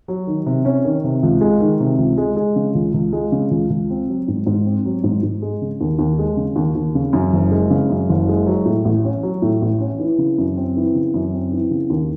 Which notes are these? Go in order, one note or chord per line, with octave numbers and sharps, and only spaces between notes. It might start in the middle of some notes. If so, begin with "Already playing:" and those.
F#3
D#3
C3
C#4
D#3
C3
C#2
G#3
D#3
C3
C#2
G#3
G#3
C#3
C#2
C#2
G#3
C#3
C#2
C#2
C4
F#3
G#2
G#2
C4
F#3
G#2
G#2
G#3
C#3
D#2
D#2
G#3
C#3
D#2
D#2
C#3
F#2
F#1
G#3
C#3
F#2
F#1
G#3
F#3
A2
A1
C#4
F#3
A2
A1
C#4
E3
C#3
F#2
C4
E3
C#3
F#2
C4
E3
C#3
D#2